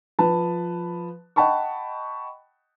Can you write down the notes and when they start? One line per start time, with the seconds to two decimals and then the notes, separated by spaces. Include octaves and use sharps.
0.19 F3 B4 A5
1.36 D#5 F#5 G5 A5 B5 C#6